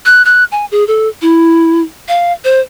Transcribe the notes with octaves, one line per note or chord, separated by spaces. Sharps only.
F#6
F#6
G#5
G#4
A4
E4
F5
C5